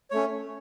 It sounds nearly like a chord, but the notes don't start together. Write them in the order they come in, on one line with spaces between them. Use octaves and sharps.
C#5 A3 C#4